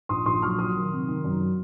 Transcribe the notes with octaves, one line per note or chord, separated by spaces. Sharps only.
A#1 C6 D#6
A#1 C6 D#6
F#3 C#6 F6
F#3 C6 D#6
D#3
C3
D#3
F#2
F#3